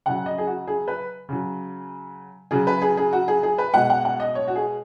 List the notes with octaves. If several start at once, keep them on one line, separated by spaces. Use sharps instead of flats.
C#3 F#3 F#5
D#5
G#4
F#4
G#4
B4
C#3 F#3
C#3 F#3 G#4
B4
G#4
G#4
F#4
G#4
G#4
B4
B2 G#3 F#5
F#5
F#5
D#5
C#5
F#4
G#4